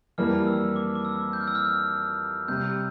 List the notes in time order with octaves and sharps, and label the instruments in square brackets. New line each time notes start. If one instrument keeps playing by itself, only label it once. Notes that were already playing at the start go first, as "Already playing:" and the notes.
[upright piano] F2 E3 G3 A#3 [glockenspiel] F6
[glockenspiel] E6
D6
D6
E6
G6
F6
E6
F6
[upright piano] C3 G3 C4 [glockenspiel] G6